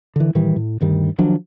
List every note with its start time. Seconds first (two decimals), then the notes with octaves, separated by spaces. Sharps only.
0.16 D3 E3
0.35 A2 D#3 E3 G3
0.56 A2
0.81 D2 G2 D#3 G3
1.18 D#3 F3 F#3 D4